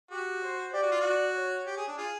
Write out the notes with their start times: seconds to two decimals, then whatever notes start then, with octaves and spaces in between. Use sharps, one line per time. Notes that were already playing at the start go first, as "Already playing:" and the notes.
0.10 F#4 G4
0.42 C5
0.73 G4 D5
0.82 F#4
0.91 F4
1.00 F#4
1.35 C#5
1.67 G4
1.77 G#4
1.87 D4
1.98 F4 G#4